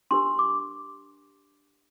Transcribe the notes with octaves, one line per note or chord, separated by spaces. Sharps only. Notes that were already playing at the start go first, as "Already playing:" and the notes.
D4 G4 A#4 C6
D6